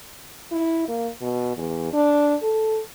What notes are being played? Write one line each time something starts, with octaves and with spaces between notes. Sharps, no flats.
E4
A#3
B2
E2
D4
A4